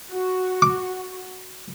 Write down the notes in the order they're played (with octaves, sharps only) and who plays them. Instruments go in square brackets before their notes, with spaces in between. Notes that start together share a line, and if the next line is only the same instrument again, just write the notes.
[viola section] F#4
[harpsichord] D6